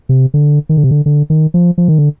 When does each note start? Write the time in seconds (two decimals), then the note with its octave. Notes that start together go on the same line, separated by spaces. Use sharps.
0.09 C3
0.34 D3
0.69 D#3
0.77 D3
0.84 C3
0.91 D3
1.06 D3
1.30 D#3
1.54 F3
1.78 F3
1.88 D#3
1.99 D3